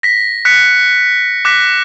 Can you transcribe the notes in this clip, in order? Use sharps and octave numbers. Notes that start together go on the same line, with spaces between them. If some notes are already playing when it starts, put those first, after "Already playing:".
A#6 B6
F#6 B6 C#7
D6 F#6 A#6 B6